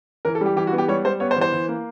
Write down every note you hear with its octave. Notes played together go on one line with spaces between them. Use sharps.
E3 A#4
A4
G3 G4
E3 G4
F#4
B3
G4
G3 C#5
G3 C5
B3 C#5
C5
E3
C5
E3
A#3